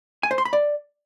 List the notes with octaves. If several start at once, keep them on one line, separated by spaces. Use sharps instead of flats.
G#5
C5
C6
B5
D5